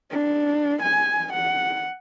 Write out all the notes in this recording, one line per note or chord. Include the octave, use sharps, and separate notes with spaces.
D4
G#5
F#5